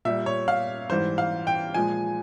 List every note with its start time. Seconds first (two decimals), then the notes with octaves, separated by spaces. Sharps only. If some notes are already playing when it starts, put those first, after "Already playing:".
0.05 A#2 G3 E5
0.26 C#5
0.48 F5
0.90 G#2 E3 G3 C5
1.18 F5
1.47 G5
1.74 A#2 F3 G#3 G#5